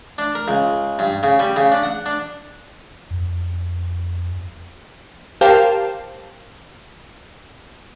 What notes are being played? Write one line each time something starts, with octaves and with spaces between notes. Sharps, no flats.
D4
A#4
C#2
G2
C#3
G3
C#3
D4
F#5
D4
F2
G4 A#4 C5 F5 G5 A5